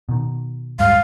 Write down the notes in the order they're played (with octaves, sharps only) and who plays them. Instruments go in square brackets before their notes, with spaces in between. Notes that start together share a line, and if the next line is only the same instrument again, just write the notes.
[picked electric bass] B2 D#3
[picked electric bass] D1 G2 G#3 [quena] F5